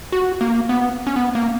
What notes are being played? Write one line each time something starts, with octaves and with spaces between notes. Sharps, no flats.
F#4
A#3
B3
C#4
B3
A#3